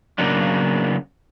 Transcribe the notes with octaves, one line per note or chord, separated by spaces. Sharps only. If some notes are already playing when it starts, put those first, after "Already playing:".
C#3 F#3 A#3 B3 D4